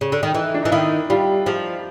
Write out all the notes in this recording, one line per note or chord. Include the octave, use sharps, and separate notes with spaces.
C#3
D3
D#3
E3 D#4
D4
E3 D#4
D#3 E4
G3 F4
F3 G4